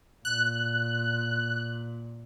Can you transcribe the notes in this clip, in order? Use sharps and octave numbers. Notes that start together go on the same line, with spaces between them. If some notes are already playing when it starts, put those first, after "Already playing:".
A#2 F#6